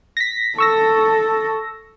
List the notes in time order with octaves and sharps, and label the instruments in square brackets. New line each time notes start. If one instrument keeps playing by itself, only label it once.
[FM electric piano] A#6 B6
[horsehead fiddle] A4 [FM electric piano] C#6 E6 A#6